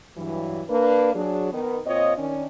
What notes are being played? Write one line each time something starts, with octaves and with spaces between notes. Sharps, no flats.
G2 E3 F#3
A#3 D4 B4
F#3 D4 G#4
D#3 B3
A#2 C4 F4 C#5 D#5
D#3 C#4 D4